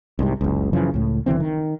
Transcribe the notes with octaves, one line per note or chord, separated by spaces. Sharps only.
C2 G#2 C3
F#1 C#2
F#2 C#3 E3 F3
C#2 A2
F#1 D3 E3 C4
D#3